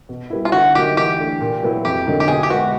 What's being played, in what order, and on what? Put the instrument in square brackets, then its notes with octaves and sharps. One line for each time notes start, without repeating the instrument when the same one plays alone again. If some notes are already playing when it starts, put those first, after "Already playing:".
[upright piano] B2
G3 B3 E4
[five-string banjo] F4
[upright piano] D3 [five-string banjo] F#4
[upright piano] F#3 A#3 D#4 [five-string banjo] G4
[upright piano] E3 [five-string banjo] G4
[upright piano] A3 D4
A#2
F#3 B3 E4
[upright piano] F2 [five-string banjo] G4
[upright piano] D3 F#3 A#3 D#4
[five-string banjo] G4
[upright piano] B2 [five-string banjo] G#4
[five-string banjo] G4
[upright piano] G#3 B3 [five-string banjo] F#4